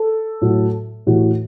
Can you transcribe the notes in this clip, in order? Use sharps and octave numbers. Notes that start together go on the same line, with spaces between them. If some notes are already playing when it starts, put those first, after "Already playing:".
Already playing: A4
A2 F#3
A2 E3 F#4